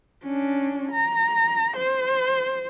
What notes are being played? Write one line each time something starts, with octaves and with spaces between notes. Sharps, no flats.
C#4 D4
A#5
C5